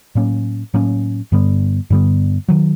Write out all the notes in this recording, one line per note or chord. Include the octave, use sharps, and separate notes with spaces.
A2 F#3 A#3 C#4
A2 F#3 A#3 C#4
G2 D3 G3 B3
G2 D3 G3 B3
D#3 F#3